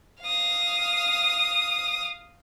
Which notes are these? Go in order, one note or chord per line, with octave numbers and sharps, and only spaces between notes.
F5 D#6